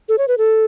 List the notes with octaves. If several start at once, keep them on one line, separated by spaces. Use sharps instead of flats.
A4
C#5
B4
A4